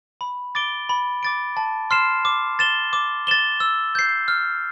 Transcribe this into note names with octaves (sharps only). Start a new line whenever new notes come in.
B5
D6 A6 D7 G7
B5
D6 A6 D7
A5
C6 F6 C7 E7
D6
A6 E7 G7
D6
A6 E7 G7
E6
G6 C7
F6